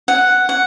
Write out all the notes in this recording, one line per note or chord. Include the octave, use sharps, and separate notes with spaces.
F#5
F#5